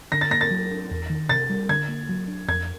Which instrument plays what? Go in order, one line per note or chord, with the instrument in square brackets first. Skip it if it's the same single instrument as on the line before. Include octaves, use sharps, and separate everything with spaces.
[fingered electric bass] D3 [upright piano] A#6
[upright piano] A6
[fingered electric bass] A#3 [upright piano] A#6
[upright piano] A6
[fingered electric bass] F#3
D4
E2
D#3
[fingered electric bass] C3 [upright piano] A6
[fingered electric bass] G3
[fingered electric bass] D3 [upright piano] G#6
[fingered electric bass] A#3
F#3
D4
[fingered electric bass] F2 [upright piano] G#6